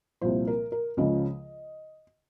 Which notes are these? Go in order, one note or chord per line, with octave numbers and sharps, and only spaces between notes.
C2 A#2 F3 C5
A#4
A#4
C#2 C#3 F3 D#5